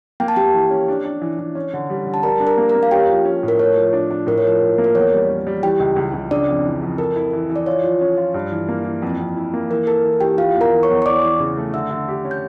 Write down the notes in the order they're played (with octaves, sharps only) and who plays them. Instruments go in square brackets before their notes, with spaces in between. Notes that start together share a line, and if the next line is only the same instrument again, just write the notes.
[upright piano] A#3 [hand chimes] G5
[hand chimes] A5
[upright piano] A#3 [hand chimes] G4 G5
[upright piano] E3
C#4
D4
D4
E3
E3
C#4
D3
G3
D3
[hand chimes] A5
[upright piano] G3 [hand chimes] A#4 A#5
[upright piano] D4
[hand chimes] A#4 A#5
[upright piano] A#3
[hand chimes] A#4 A#5
[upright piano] A#3
[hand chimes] F5
[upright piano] C#4 [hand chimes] G4 G5
[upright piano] F3
C#4
A2
[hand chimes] A#4
[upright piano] A3 [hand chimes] C#5
[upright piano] F3
D4
D4
[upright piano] A2 [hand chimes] A#4
[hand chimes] C#5
[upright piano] F3 [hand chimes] A#4
[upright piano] A2
A#3
[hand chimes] A#4
[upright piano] E2 [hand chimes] C#5
[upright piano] G3
C#4
G3
[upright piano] E3 [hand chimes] G4 G5
[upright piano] C#2
C#2
C#2
[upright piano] C#3 [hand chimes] D4 D5
[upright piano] F2
E3
F2
[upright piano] A4 [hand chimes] A#4
[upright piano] E4
E3
E3
[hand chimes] D5
[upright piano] F4 [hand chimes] C#5
[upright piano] F3
C#4
F4
G2
E3
A#3
E3
F2
F2
E4
A#3
[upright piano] E3 [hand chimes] A#4
[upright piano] A4 [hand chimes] A#4
[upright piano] E3
[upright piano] E3 [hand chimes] G4 G5
[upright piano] E3 [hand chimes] F4 F5
[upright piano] E2
[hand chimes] A#4 A#5
[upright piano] E3
[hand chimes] C#5 C#6
[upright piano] E2
[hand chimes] C#6
[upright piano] E3 [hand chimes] D5 D6
[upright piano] E3
C#3
A3
[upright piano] D3 [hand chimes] E5 E6
[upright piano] D3
G4
C#4
[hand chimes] G6